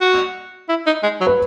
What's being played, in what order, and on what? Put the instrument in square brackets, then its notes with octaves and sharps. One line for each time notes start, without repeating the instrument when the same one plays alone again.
[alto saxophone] F#4
E4
D#4
G#3
F#3
[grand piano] B4